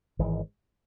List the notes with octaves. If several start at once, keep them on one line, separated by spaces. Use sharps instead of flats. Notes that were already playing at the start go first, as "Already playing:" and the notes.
G#1 G#2 E3 G#3